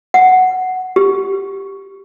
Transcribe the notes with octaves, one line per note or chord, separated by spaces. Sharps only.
F#5
G4